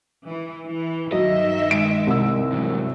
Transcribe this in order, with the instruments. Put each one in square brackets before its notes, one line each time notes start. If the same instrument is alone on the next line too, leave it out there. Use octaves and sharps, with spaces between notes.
[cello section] E3
E3
[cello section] G2 D#3 E5 [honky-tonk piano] F#3 [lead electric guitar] D#5
[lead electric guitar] G#3 [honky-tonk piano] D7
[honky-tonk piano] C2 E6
[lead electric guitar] E2 G#2 [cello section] F#3